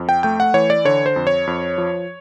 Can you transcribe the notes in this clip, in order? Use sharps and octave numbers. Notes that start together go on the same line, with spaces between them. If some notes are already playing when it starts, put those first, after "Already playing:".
Already playing: F2
G5
A3 G5
F#5
E3 C#5
D5
D3 C#5
C5
F2
C#5
F2
F3